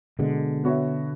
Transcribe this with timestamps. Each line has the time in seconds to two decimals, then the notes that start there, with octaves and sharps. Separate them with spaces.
0.19 B2 D3 G#3
0.64 B3 F#4 C#5 E5